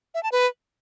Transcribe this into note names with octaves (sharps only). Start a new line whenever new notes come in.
E5
A5
B4